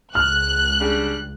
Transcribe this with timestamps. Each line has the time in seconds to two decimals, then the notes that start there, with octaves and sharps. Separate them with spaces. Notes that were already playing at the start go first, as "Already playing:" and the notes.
0.15 C#2 F6 F#6
0.80 C#3 G3 D4